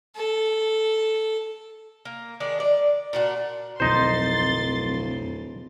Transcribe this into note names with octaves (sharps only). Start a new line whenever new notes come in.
A4
A#3
D#3 G#3 D4
D5
A#2 D4 F#4
D1 B1 F2 D#4 C5 C6 A6